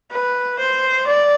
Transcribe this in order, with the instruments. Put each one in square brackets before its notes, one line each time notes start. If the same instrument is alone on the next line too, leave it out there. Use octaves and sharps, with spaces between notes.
[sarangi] B4
C5
D5